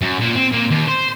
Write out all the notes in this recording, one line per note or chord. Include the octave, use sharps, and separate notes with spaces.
F#2
A#2
C4
A#2
D#2
C5